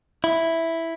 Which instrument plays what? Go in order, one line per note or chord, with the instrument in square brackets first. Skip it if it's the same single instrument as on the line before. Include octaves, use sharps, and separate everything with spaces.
[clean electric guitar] E4